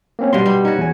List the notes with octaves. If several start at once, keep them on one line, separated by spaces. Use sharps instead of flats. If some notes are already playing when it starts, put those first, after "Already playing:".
A#3 C4 C#4
G2 B2 C6
G3
C#4 D#4 F#4
E2 G#5